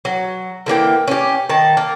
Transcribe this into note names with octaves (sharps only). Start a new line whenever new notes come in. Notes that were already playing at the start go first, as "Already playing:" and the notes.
F#3
D3 E3 A#3 G5
C#4 G4
D#3 A5
A#3